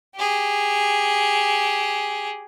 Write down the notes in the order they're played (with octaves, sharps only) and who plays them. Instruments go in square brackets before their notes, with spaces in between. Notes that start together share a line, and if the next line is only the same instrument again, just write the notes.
[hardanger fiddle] G4 G#4